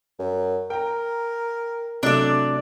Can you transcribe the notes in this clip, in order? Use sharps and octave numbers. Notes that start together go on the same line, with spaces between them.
F#2
A#4 G5 A#5
C3 F#3 A3 D4 D5